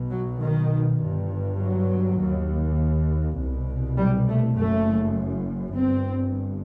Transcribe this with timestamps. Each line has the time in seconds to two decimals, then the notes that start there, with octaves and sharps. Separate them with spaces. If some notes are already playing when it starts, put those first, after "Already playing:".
Already playing: B1 B2
0.11 F#3
0.41 D#3
1.01 G1 G2
1.60 F#3
2.20 D#2
3.39 C2 B2
3.99 G3
4.28 A3
4.57 F#1 F#2 A3
5.78 G1 G2 C4